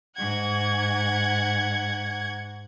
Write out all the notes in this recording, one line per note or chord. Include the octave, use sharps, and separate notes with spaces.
G#2 F#5 G#6